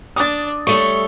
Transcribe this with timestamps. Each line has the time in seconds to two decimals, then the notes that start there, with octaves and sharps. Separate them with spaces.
0.16 D4 D6 D#6 A6
0.67 G3 A3 C#5 C#6